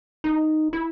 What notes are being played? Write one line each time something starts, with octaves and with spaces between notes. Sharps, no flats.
D#4
E4